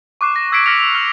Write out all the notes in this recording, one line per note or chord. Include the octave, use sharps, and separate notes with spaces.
C#6 D6 F#6 C7
A#6
E6 G#6 B6 C7 D7
F6 A#6 B6 C#7 F7
F7
F6